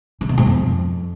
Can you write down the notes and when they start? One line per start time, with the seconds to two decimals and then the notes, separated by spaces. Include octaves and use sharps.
0.21 C#3
0.29 B2
0.38 G#2
0.46 F2